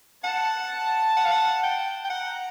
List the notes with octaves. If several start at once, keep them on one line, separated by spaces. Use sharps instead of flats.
F#5 A5
F#5
F5
F#5
G5
G5
F#5 A#5